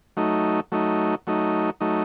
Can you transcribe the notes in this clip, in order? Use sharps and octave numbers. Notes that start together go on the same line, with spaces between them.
F#3 A3 D#4
F#3 A3 D#4
F#3 A3 D#4
F#3 A3 D#4